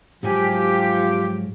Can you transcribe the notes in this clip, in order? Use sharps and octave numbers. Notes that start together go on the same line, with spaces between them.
G#2 F3 F#3 G4 G#5